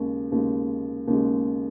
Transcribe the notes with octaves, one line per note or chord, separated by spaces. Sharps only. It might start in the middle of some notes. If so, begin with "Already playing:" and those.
Already playing: D#2 C#3 G#3
D#2 C#3 G#3
D#2 C#3 G#3